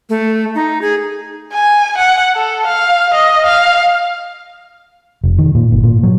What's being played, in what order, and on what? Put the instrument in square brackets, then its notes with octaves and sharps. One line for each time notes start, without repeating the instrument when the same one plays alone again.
[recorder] A3
D#4
G#4
[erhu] G#5
F#5
A4
F5
D#5
F5
[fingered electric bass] F1
D#3
A#2
G1
A#2
F#3